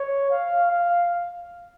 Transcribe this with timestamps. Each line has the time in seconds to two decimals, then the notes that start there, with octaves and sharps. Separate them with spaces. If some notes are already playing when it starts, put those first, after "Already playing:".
Already playing: C#5
0.31 F5
0.71 F5